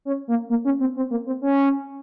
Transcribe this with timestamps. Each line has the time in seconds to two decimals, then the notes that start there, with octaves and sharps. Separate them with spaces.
0.05 C#4
0.28 A#3
0.50 A#3
0.65 C#4
0.80 C4
0.96 C4
1.11 A#3
1.26 C4
1.41 C#4